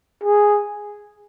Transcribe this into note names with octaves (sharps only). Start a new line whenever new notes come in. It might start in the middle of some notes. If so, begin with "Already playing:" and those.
G#4